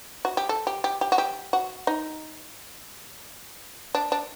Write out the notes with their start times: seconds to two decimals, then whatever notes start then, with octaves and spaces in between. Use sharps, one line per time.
0.25 F#4
0.37 G4
0.49 A4
0.67 G4
0.84 G4
1.01 G4
1.12 F#4
1.18 G4
1.53 F#4
1.87 D#4
3.95 D4
4.12 D4